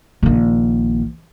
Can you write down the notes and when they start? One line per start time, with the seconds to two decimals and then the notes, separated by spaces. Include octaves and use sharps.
0.23 A#1 D#3